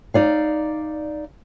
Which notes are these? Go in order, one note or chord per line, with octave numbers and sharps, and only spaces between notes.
D#4 D5 F5